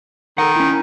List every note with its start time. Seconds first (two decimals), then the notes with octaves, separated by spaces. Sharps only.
0.38 D#3 A4 F#5
0.56 C#4 E4